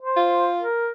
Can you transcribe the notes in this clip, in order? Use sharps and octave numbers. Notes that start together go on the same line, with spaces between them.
C5
F4
A#4